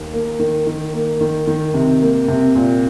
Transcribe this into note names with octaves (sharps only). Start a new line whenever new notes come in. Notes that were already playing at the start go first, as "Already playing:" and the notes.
Already playing: D#2
A#3
D#3
D#3
A#3
D#3
D#3
C3
A#3
C3
A#2